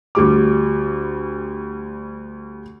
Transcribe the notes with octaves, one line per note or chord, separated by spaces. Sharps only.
D2 G3 D6